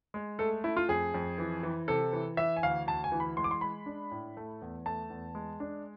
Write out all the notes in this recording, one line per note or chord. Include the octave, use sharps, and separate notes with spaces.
G#3
A3 A4
A3 E4
F4
F2 G#4
F2
E3
E3
C3 A4
E3
E3 E5
G#5
D2 F5
D2 A5
G#5
E3
B5
G#3 C6
D6
C6
G#3 B5
D4
A2
A3
E2
A3 A5
E2
G#3
D4